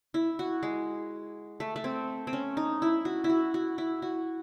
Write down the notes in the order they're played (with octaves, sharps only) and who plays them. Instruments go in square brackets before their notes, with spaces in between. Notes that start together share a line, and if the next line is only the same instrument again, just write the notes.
[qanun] E4
F#4
G#3
A3
A3
C4
C4
C#4
D#4
E4
F#4
E4
F#4
F#4
E4
F#4